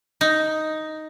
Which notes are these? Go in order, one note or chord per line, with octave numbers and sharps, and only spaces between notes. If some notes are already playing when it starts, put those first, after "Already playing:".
D#4